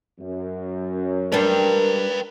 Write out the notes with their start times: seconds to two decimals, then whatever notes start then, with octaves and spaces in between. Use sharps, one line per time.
0.20 F#2
1.32 G3 D4 A#4 B4 G5